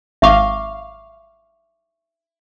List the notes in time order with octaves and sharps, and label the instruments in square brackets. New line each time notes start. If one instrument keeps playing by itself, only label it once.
[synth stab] G#1 F5 [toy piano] E5 C#6 D6